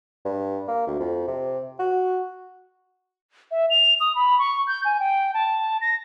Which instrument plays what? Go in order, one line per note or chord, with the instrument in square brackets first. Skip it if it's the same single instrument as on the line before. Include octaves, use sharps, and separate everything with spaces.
[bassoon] G2
A#3
D2
F2
C3
F#4
[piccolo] E5
F7
D#6
B5
C#6
G6
G#5
G5
A5
A#6